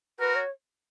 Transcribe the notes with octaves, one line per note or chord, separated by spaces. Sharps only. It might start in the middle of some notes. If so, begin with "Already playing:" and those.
F#4 A#4 B4
C#5